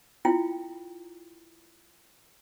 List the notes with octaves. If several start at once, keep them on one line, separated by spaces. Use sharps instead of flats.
E4 F4 G5